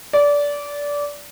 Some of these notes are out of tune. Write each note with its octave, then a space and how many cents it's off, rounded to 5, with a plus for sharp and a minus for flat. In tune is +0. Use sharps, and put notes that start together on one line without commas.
D5 -20